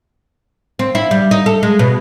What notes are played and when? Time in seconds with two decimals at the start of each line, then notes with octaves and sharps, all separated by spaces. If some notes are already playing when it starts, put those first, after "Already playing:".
0.79 C4
0.95 E4
1.11 G3
1.31 D#4
1.46 A4
1.63 G#3
1.79 B2